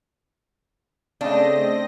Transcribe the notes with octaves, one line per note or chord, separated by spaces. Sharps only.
C#3 A3 C4 D4 D#5 A#6